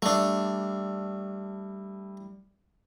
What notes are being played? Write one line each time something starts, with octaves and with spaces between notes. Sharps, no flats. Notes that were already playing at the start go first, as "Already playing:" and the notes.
G3 A3 D4